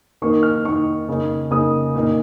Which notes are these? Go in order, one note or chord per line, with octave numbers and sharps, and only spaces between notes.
D#3 A#3 D#4 C#6
F6
D#3 A#3 D#4 C#6
C#3 A#3 D#4
C#3 A#3 D#4 D#6
A#2 A#3 D#4